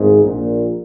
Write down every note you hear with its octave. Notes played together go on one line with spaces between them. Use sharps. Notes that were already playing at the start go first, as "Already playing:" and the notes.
Already playing: G#1 G#2
A#1 A#2